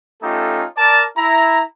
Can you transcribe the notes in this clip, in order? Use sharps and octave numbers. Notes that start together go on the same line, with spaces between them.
A3 C#4 D#4 F4 G4 A4
A#4 D5 A5
E4 A#5